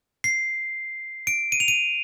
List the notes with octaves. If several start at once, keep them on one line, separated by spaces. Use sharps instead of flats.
C7
D7
D#7
F7
D#7